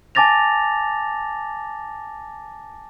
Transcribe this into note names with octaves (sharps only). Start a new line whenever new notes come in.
G#5 A5 D6 A6 A#6 F7